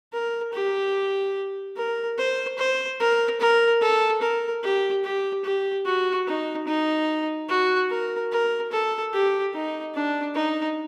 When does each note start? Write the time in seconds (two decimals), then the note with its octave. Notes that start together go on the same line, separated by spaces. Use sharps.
0.13 A#4
0.54 G4
1.77 A#4
2.18 C5
2.58 C5
3.00 A#4
3.41 A#4
3.81 A4
4.22 A#4
4.63 G4
5.04 G4
5.45 G4
5.86 F#4
6.27 D#4
6.68 D#4
7.49 F#4
7.90 A#4
8.32 A#4
8.72 A4
9.13 G4
9.54 D#4
9.95 D4
10.36 D#4